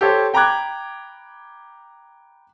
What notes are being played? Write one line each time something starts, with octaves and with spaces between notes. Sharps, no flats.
G4 A4 C5 C#5
G5 A#5 B5 D6 F#6 G#6